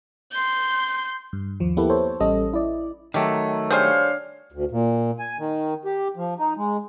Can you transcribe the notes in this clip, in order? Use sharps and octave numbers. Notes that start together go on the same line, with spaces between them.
C6 G6
G2
D#2 F3
A#3 B3 E4 G4 A4 B4
A4 C5 C#5
A1 G3 C#4 A4 D#5
E4 D5
D#3 F#3 A3 G4
G3 D4 G#4 C5 C#5 F5
D2
A#2
G#5
D#3
G4
F3
D#4
G#3